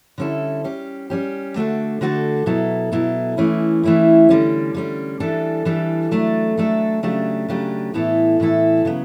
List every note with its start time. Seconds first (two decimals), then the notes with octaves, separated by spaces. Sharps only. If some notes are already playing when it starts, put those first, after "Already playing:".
0.18 D3 G3 C#4 E4 A4
0.64 G3 C#4 G4
1.10 G3 C#4 G4
1.56 D3 A3 D4 F#4 A4
2.01 D3 A3 D4 F#4 A4
2.46 B2 F#3 B3 E4 A4
2.92 B2 F#3 B3 E4 A4
3.37 E3 A3 C#4 E4
3.83 E3 A3 C#4 E4
4.29 D3 G3 C#4
4.74 D3 G3 C#4
5.20 E3 G3 D4 A4
5.65 E3 G3 D4 A4
6.11 F#3 A3 D4 A4
6.57 F#3 A3 D4 A4
7.03 C#3 F#3 A3 D4 G4
7.49 C#3 F#3 A3 D4 G4
7.94 A2 E3 B3 E4 A4
8.40 A2 E3 B3 E4 A4
8.85 C#3 F#3 B3